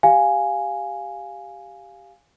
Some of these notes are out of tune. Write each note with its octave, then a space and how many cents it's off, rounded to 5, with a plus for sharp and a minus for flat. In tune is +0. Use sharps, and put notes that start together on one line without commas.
G4 +0 F5 +0 G#5 +0